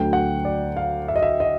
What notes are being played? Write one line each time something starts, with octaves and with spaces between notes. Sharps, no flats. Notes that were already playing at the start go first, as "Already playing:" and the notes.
Already playing: D2 D3 F#3 G5
F#5
D5
F5
E5
D#5
E5
D#5